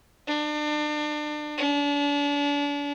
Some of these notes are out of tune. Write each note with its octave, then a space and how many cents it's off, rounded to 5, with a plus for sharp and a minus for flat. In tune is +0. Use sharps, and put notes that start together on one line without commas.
D4 +35
D4 -35